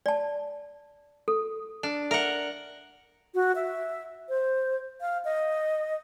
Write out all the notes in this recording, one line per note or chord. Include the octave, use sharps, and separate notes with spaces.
D5 A5
A4
D4
A#4 E5 F#5
F#4
E5
C5
F5
D#5